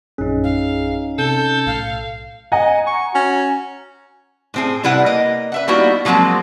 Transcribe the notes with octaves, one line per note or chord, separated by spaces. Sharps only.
A#1 F#2 C#4 D#4 G#4
F5
C3 A4 G6
B1 A2 F5
D#5 F#5 G#5 A#5
C#6
C#4 F#4
A2 C4 G#4
C3 G3 E4 B4 F#5
A#3 D#5
B4 E5 F#5
G3 A#3 B3 D#4 E4 F#4
F3 F#3 G#3 A#3 C4